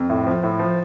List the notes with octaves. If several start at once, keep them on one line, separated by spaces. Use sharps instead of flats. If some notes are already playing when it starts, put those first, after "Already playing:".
Already playing: F2
A2
F3
A2
F3